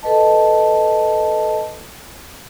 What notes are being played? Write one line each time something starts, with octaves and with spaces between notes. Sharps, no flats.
A4 B4 D#5 A5